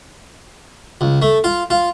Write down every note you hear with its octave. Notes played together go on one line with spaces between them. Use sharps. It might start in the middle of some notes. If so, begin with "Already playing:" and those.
C#2
A3
F4
F4